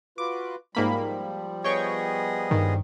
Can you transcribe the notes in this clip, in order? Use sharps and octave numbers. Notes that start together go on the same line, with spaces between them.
F4 F#4 B4 D6
G#2 F3 G3 A#3 B5
B3 G#4 C#5 D#5 G5 C#6
G2 D#3